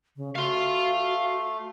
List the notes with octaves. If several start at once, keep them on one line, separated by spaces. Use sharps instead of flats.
C#3
A3 F#4 F5 C6